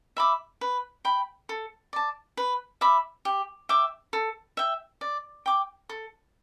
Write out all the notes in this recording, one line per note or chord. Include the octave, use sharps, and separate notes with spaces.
E5 B5 D6
B4
G5 B5
A4
D5 A5
B4
E5 B5 D6
G4
E5 G5 D6
A4
E5 G5
D5
G5 D6
A4